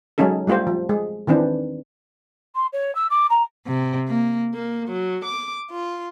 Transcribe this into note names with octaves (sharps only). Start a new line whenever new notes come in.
F#3 G#3 C#4 D#4 A4
G3 A3 F4 G4 C5
F3
G#3
D#3 E3 C4 D4
C6
C#5
E6
D6
A#5
C3
A#3
A#3
F#3
D6
F4